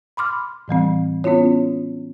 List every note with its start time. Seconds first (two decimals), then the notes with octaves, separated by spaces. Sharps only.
0.17 B5 C6 D6 F6
0.68 A2 E3 G3 C4
1.24 B3 C#4 E4 F4 C#5